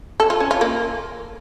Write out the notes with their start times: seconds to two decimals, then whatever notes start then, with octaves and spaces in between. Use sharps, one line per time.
0.20 A4
0.30 F4
0.40 C#4
0.51 F4
0.61 A#3